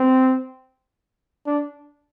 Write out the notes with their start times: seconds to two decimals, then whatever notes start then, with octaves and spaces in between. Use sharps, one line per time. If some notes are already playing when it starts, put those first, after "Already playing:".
Already playing: C4
1.47 D4